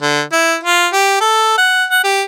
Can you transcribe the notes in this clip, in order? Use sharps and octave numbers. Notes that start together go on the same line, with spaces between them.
D3
E4
F4
G4
A4
F#5
F#5
G4